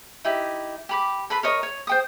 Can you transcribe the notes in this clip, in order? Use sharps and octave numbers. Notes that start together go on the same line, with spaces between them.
D#4 E4 G4
G4 B5 D6
A4 B4 B5 C6
A#4 C#5 D#5 C#6
C#5
C5 G5 D#6